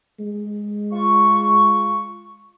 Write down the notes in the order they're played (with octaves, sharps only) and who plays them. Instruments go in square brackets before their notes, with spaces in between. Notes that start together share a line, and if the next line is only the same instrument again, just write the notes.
[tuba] G#3
[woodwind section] F4 C#6